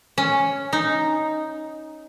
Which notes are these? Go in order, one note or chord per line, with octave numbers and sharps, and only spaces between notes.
C#4
D#4